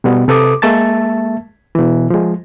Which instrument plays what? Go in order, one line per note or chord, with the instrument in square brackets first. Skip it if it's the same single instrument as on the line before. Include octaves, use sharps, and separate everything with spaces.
[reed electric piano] B2 G3 B3
C3 A4 B4 D6 D#6
G#3 A#3 E5 A5 A6
B2 E3
F3 G#3